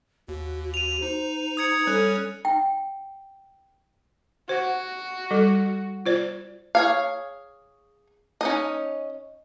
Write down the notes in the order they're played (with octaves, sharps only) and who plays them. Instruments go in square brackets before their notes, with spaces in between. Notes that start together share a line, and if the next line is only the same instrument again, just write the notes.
[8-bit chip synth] D#2 [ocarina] F#4
[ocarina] F#4 [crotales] D#7 F7
[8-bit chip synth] D#4 [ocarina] C5
[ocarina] C5 [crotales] D#6 G#6 C#7
[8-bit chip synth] G3 C#4 C#5 [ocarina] A4 [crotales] F#6
[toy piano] G5
[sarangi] F#4 [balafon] C5 F#5
[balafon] G3 A4
F4 C5 D5
[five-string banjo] G#4 C#5 F5
C#4 D#4 D#5